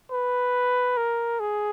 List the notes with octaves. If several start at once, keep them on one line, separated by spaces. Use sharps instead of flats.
B4
A#4
G#4